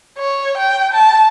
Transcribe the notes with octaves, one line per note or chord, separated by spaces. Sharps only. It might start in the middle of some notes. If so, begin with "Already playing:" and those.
C#5
G5
A5